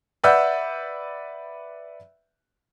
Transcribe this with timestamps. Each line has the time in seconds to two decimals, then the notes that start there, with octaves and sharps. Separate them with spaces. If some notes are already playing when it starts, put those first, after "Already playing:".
0.24 B4 D5 E5 F#5 E6 G6